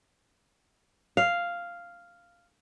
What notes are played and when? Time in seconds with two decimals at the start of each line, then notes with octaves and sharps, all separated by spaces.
1.17 F5